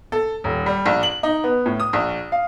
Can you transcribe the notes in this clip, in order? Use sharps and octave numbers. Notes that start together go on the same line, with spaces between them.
A4
D#1
G3
A#1
F#7
D#4
B3
A2
D#6
A#1
F5